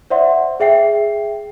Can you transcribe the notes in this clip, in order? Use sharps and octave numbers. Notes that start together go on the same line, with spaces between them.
C5 D5 E5 F#5 C6
G#4 E5 G5 C7